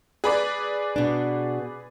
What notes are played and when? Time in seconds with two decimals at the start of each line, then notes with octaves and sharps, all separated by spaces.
0.24 G#4 B4 D5
0.96 B2 D4